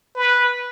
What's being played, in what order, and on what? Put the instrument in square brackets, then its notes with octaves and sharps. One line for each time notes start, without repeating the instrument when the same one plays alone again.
[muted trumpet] B4